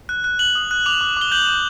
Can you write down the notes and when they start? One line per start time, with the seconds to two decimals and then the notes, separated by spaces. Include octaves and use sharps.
0.09 F#6
0.24 F#6
0.39 F#6 F#7
0.55 D#6
0.71 F#6
0.86 D6 F7
1.01 D6
1.17 D6 G7
1.32 G6 F#7
1.47 G6